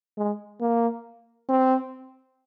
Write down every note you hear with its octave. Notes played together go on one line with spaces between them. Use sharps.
G#3
A#3
C4